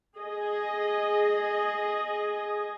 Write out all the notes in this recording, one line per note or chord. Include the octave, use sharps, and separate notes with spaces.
G#4 D#5